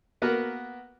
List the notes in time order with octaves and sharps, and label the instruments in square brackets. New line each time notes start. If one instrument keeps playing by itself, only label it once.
[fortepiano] A#3 B3 F#4 A#4 B4